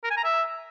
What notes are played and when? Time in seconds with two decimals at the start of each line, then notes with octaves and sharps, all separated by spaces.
0.04 A#4
0.11 G#5
0.17 A#5
0.24 E5